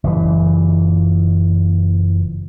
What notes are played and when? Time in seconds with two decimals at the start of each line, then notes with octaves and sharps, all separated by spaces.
0.04 F#1 A#2 E3